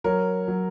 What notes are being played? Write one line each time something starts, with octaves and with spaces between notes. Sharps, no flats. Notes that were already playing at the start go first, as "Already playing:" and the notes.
F#3 A#4 C#5
F#3